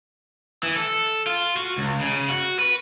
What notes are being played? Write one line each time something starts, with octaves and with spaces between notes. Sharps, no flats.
E3
A4
F4
F#4
C#2
C#3
F#4
B4